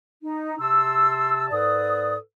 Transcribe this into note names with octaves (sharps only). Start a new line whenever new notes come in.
D#4
C3 A5 C6 E6
G#2 A4 B4 D5 D#6